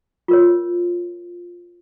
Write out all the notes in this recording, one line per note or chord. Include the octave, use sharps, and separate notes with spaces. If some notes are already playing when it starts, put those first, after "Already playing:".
F4 A#4 C#5